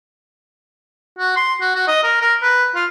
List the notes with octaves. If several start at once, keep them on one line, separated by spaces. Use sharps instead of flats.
F#4
C6
F#4
F#4
D#5
A#4
A#4
B4
F4